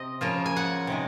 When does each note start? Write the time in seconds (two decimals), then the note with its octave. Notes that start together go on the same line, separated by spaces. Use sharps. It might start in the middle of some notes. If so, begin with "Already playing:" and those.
Already playing: C3 C4 D#5
0.21 C#3 F3 A#3 F4
0.46 G#5
0.57 F#5
0.87 C3 D#3 G#3